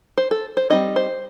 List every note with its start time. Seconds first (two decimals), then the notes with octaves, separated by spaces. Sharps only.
0.18 C5
0.31 A4
0.57 C5
0.70 G3 C4 D#4 D#5
0.96 C5